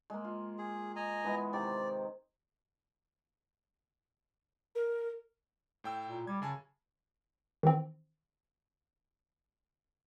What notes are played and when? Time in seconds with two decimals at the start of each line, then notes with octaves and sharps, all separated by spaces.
0.10 G#3 A#3
0.24 F4
0.58 G#4
0.96 D#5 G#5 A#5
1.24 E3 G#3 B3
1.53 C3 D#3 D5 A#5
4.75 A#4
5.84 A2 G5 E6
6.09 A#2
6.27 G3 G#6
6.42 F#2 C#3 G#5 A5
7.63 D#3 E3 C4